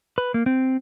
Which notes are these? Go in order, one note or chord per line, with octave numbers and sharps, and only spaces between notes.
B4
A#3
C4